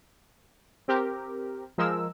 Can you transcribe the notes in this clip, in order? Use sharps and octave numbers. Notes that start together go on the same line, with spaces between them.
C4 G4 A#4
F3 G#3 A#4 E6